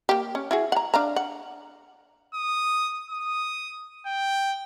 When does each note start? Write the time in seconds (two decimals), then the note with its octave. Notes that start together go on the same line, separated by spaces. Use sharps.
0.09 A#3 G4
0.35 C#4
0.51 E4 F#4 G#4
0.72 F#5 A#5
0.94 D4 F5 A#5
1.16 F#5
2.34 D#6
3.11 D#6
4.07 G5